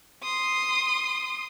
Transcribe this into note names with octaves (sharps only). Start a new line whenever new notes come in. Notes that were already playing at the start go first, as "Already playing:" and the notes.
C6 D#6